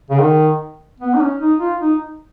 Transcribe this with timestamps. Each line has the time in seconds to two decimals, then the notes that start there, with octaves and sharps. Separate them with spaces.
0.10 C#3
0.20 D#3
1.00 B3
1.15 D#4
1.20 C#4
1.40 D#4
1.60 F4
1.81 D#4